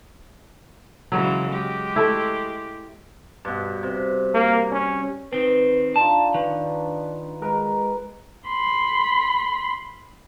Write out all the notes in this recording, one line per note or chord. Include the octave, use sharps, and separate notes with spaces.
C#3 E3 F#3 G#3
G#3 G4
A3 E4
G2 B2
C3
A#3
C#4
D#3 C4 B4
D4 D#4 F4 A5
D#3 B4
G#3 A#4 B4 A#5
B5 C6